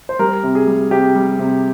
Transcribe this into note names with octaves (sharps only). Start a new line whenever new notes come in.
C5
G3 A#4
C3
G#4
G3
C3 G4
G3
C3